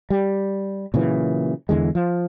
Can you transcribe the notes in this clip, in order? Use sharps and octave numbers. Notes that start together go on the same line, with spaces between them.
G3
A#2 C#3 E3 F#3
E2 D3 E3 G#3
F3